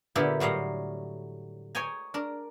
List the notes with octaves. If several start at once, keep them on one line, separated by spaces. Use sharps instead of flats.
A#2 D3 B3 E4 G4 A#4
A2 F#3 G3 F5 A#5
C#5 D#5 G5 G#5 A#5
D4 A#4